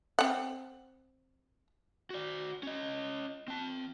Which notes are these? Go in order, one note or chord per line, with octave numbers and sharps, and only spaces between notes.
C4 F#5
F#4 D5
C#4 D#5
C4 A5